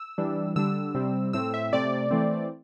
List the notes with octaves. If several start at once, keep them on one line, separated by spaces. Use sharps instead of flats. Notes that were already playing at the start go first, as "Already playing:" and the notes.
Already playing: E6
E3 G3 D4
D3 G3 D4 E6
C3 G3 C4
A2 A3 C4 E6
E5
C3 A3 C4 D5
E3 A3 C4